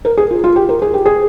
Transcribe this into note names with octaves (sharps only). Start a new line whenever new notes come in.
A#4
G#4
F4
F4
G4
A#4
G#4
G4
G#4